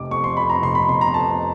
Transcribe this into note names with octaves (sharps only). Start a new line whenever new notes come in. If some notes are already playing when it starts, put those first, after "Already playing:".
Already playing: F1 C3 D6
F2 C#6
C6
F2 B5
A#5
F1 C6
B5
F1 C6
A#5
F2 A5